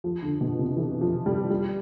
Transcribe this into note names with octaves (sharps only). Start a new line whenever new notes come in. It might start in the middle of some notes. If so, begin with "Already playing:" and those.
F3
D3
B2
C3
E3
F3
G3
G3